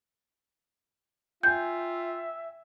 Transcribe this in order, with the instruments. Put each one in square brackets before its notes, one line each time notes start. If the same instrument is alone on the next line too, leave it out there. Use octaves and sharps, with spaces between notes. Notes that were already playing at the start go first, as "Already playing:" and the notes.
[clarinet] F4 [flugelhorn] E5 [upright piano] G5 G#5 [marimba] G6